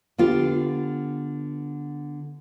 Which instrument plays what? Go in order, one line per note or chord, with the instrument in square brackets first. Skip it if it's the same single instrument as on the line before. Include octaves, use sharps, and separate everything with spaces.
[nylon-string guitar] D3 B3 F4 G4